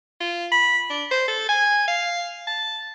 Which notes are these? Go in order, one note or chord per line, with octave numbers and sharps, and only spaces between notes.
F4
B5
D4
C5
A4
G#5
F5
A5